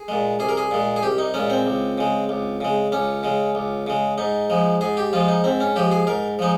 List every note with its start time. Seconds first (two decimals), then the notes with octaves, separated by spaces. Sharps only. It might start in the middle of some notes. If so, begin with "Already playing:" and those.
Already playing: G#4
0.08 A#2 G#3
0.39 C2 G#4
0.49 A#4
0.57 G#4
0.71 A#2 G#3
0.96 G#4
1.03 C2 G4
1.18 D#4
1.34 A#2 G#3 C#4
1.50 C4
1.66 C#2
1.98 C#3 G#3
2.29 C#2
2.61 C#3 G#3
2.92 C#2 C#4
3.23 C#3 G#3
3.55 C#2
3.87 C#3 G#3
4.18 G#2 D#4
4.50 F3 G#3
4.81 G#2 G#4
4.97 G4
5.13 F3 G#3 F4
5.28 D#4
5.44 G#2 C4
5.60 C#4
5.76 F3 G#3 G4
5.92 G#4
6.07 G#2 A#4
6.39 F3 G#3 D#4